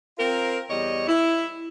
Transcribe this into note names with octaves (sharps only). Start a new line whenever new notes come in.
C4 F4 A#4
E2 G3 C#5 D#5
E4